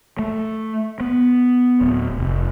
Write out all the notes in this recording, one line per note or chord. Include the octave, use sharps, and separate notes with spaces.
A3
B3
D1
F1